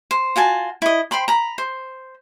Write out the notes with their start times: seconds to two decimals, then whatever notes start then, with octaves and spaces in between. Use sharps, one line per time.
0.11 C5
0.36 F4 F#4 G#5 A5
0.82 E4 D#5
1.11 C5 G5 B5 C6
1.28 A#5 B5
1.58 C5